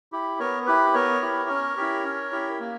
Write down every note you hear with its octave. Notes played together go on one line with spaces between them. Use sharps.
E4 G4
B3 A#4 C#5
E4 G4 B4
B3 A#4 C#5
E4 G4
C#4
E4 G4
C#4
E4 G4
A#3